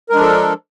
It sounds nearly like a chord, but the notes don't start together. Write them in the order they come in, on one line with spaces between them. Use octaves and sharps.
A#4 G#3 D4 F3 A4